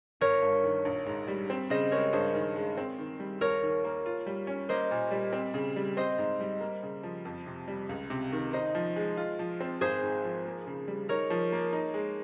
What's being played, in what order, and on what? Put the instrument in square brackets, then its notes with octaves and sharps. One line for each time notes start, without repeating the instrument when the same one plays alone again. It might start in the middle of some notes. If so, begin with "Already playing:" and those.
[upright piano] G1 [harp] A#4 C#5
[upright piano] G2
D#3
A#1
G#2
G3
C4
[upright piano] C#3 [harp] C5 D#5
[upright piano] G#3 [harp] A#4 C#5
[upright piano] G2 [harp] G#4 C5
[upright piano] D#3
G#3
C4
D#3
G3
[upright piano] D#2 [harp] A#4 C#5
[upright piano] D#3
A#3
F4
G3
C#4
[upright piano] A#3 [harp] C5 D#5
[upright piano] A#2
G3
C4
C#3
G3
[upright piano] C4 [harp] C5 D#5
[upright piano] G#2
G3
A#3
C#3
F3
F2
C3
G3
C#2
C3
D#3
[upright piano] D#4 [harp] C5 D#5
[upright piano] F3
G#3
F4
F3
C4
[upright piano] G#1 [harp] G#4 C5
[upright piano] G#2
F3
A#3
C#3
G3
[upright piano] D#4 [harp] A#4 C#5
[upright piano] F3
A#3
D#4
G#3